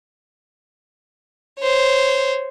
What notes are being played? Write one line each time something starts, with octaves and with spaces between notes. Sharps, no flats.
C5 C#5